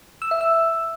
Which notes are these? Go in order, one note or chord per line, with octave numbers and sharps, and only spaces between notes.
E6
E5
E6